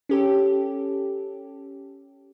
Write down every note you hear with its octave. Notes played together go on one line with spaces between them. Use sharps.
C#4 G4 A4